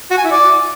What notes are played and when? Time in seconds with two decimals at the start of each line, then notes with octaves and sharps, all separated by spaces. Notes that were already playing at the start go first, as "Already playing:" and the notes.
0.11 F#4
0.18 G#5
0.24 E4
0.31 D5